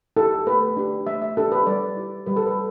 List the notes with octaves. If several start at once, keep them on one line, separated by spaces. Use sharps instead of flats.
E4 G4 A4
A3 B4
D4 G4
A3 E5
E5
D4 G4 A4
B4
G3 D5
E4 G4
G3 B4
A4
B4